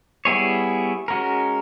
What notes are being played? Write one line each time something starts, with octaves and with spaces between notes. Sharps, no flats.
G3 B3 E4 G#4 C#5
G#3 C#4 F#4 A#4